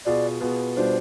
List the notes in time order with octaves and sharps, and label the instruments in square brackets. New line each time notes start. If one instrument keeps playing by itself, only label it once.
[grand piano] B2 B3 F4 G#4 [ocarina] D5
[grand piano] B2 B3 F4 G#4
[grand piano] B2 G3 D4 F4 [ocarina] C5